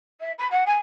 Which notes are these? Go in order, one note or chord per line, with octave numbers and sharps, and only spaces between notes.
E5
B5
F#5
G#5